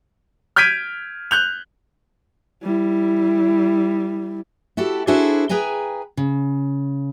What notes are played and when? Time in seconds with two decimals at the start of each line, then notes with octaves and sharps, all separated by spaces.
0.56 F6 G6 G#6 B6 D7 D#7
1.31 F#6 G6 F7
2.63 G3 E4
4.77 E4 F#4 G4 A4
5.07 D4 E4 F#4 G#4 A4 C5
5.49 G#4 B4 G5 G#5 A#5
6.17 C#3